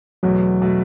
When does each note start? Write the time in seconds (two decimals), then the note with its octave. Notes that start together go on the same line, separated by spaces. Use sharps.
0.23 E2 B2 F#3 A3
0.62 B2 A3